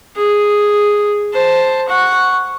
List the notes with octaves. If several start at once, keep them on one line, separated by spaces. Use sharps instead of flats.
G#4
C5 A5
F#5 C#6